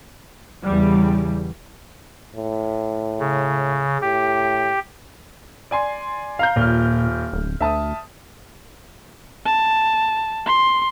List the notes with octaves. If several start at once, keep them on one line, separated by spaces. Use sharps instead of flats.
E2 C#3 G3
A2
C#3
A2 G4
D5 G#5 C6
F5 A#5 G6
D#1 A#2 F6
D1
D2 E5 A5 D#6
A5
C6